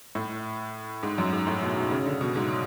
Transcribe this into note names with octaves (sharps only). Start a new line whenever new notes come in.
A2
G#2
F#2
G#2
A2
B2
B2
C#3
D3
B2
G#2